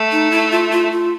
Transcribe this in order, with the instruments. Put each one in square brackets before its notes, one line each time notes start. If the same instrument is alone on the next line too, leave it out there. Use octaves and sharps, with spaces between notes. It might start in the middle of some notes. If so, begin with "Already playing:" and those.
Already playing: [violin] A3
[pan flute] D#4
E4
F4
F4
F4